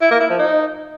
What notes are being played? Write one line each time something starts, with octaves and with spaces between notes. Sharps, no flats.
E4
A#3
E4
F3
D#4